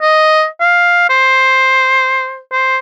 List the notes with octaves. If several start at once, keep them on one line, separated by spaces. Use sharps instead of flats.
D#5
F5
C5
C5